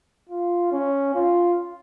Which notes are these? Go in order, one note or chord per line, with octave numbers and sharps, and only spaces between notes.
F4
C#4
F4